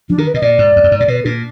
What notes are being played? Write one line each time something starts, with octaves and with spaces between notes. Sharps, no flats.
F3 D4
D#3 A#4
B4
B2 D#5
A#2 D5
G#2
F2
F#2
G#2
A#2 D5
B2 B4
A#2 D4